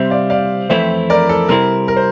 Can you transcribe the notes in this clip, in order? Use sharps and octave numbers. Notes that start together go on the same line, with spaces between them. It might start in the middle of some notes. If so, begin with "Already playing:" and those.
Already playing: C3 G3 C4 C5 E5
D5 F5
D5 F5
F2 E3 A3 C4 E4 C5 E5
A#4 D5
A4
C3 G3 C4 E4 A#4
A#4
C5